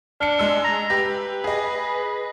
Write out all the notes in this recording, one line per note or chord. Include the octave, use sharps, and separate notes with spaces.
D4 F6 C#7
G#3 E6
A#5
G4 B4
G#4 D#5